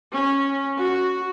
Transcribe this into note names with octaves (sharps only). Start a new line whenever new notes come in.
C#4
F#4